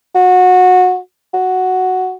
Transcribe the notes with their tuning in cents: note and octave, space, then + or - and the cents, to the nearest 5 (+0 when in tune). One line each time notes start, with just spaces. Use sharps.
F#4 -20
F#4 +0